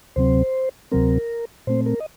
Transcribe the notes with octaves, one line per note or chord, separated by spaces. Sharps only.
D2 C3 F#3 C4 C5
D2 C3 F#3 C4 A#4
A#2 A3 C4 C5
A#4
D#5